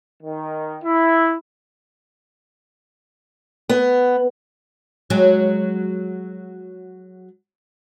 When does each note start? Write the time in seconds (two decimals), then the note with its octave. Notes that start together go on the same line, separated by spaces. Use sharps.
0.23 D#3
0.84 E4
3.69 B3
5.10 F#3 G#3